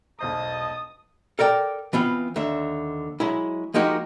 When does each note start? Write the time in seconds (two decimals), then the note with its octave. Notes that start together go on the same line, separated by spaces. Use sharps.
0.20 E1 B1 C5 D#5 A5 D#6
1.39 A4 A#4 D5 G5
1.93 E3 B3 C4 F4
2.36 D#2 D3 E5
3.20 F#3 G#3 E4
3.74 F3 G#3 A#3 D#4 F#4 G4